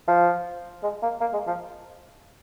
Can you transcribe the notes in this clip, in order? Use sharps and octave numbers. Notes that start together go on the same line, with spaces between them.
F3
G#3
A#3
A#3
G#3
F3